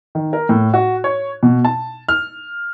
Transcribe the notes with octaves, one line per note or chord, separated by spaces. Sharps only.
D#3
A#4
A2
F#4
C#5
B2
A5
F6